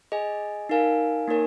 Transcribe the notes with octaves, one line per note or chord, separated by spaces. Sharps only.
G#4 D#5 G#5
D#4 A#4 F5 G#5
A#3 D#4 A#4 C#5 G#5